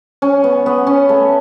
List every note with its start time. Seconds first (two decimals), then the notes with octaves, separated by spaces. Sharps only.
0.22 C#4
0.44 B3
0.66 B3
0.87 C#4
1.09 A3